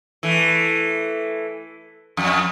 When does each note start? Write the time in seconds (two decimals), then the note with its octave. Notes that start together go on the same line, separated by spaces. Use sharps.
0.23 E3 A3
2.17 F2